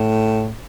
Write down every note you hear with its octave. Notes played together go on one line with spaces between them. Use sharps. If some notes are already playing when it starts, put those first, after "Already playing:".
Already playing: A2